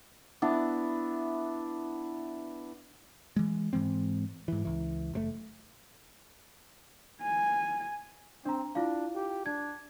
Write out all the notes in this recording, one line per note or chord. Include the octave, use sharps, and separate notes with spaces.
B3 D4 E4
E3 G#3
G#2 E3 G#3 C4
G#2 E3
C#2 E3
F#1 B2 A3
G#5
C4 D4 A#5
D4 E4 F4 F5
G4
D4 G#6